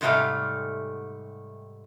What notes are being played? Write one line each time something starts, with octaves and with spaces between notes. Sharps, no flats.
G#2 C3 G3 A3 D5 F5